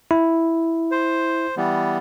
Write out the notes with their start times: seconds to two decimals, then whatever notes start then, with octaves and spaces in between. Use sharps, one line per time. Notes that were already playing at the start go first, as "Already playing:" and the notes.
0.11 E4
0.91 C5
1.57 E3 G3 B3